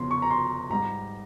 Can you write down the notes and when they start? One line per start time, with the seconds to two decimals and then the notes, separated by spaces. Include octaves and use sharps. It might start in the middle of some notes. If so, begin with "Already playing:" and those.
Already playing: E2 C#3 F3 C6
0.11 C#6
0.22 A#5
0.31 C6
0.70 G#2 G3 A#5